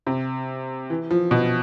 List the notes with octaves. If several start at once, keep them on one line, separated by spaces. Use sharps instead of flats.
C3
E3
F3
B2